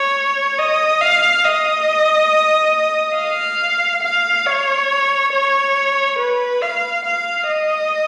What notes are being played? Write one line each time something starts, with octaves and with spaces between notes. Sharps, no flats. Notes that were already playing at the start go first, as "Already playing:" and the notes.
Already playing: C#5
D#5
F5
D#5
F5
F5
C#5
C#5
B4
F5
F5
D#5